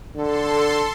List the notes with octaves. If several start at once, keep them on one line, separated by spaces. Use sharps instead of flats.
D3 A4 C6